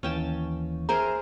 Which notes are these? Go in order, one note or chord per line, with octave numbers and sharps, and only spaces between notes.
D#2 E3 C#4 F5 G5 A5
G#4 A#4 C5 E5 A#5